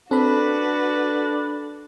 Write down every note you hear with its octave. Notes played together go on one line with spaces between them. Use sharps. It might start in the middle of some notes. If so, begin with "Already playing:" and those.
C4 D4 F#4 A4 B4 B5